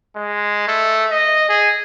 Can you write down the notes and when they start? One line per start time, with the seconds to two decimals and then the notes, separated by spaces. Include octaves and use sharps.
0.16 G#3
0.68 A3
1.11 D#5
1.49 G#4